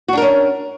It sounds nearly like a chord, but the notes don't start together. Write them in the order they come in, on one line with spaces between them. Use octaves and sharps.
F#4 D4 A#4 C#4